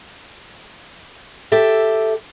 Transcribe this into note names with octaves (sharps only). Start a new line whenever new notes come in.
G4 A4 E5